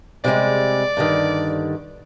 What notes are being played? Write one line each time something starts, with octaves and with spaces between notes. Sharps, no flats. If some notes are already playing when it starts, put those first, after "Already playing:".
C3 G3 G#3 D5
G2 D3 D#3